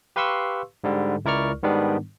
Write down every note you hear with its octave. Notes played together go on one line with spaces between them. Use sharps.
G4 B4 F5 C6 C#6 E6
G#2 D3 G3
C#2 E4 A#4 D5 C#6 F6
G#2 D#3 G3 B3 D4